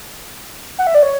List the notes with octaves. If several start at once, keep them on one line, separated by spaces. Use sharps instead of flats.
F#5
E5
D5
C#5